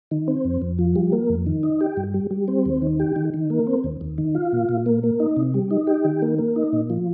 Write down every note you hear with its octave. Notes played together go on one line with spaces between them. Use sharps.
D#3
C4
F2
F2
F3
G3
A#3
F2
D#3
D#4
G4
G2
G3
G3
C4
D#2
D#3
G4
D#3
D#3
A#3
C4
D#2
D#2
D#3
F4
A#2
A#2
A#3
A#3
D#4
C3
G3
D#4
G4
D#3
A#3
A#3
D#4
A#2
F3